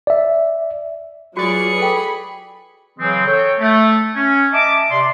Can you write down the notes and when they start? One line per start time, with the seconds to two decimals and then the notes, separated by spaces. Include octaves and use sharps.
0.07 D5 E5
1.37 F#3 F4 F#4 G#4 B4 D5 C#6
1.78 A4 G5 B5
2.99 C#3 E3 F#3 G#3 C4
3.26 A4 C#5 G5
3.60 A3
4.15 C#4
4.52 D#5 E5 A5 A#5 D6
4.90 C3 D5 C6